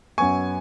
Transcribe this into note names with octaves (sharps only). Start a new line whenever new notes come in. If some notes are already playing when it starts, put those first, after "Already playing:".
F#2 F#3 B3 G#5 C#6